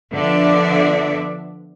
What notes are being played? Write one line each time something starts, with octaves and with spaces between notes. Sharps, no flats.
D3 F3 B3 D4 D5 E5